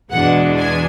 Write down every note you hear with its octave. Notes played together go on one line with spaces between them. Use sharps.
E2 B2 G#3 D4 F#5
G#5